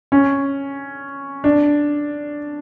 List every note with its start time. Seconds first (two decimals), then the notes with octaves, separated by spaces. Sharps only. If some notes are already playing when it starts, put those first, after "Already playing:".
0.12 C#4
1.44 D4